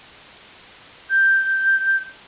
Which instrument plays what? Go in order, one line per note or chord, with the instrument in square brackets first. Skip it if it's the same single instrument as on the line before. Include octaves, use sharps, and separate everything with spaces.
[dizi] G6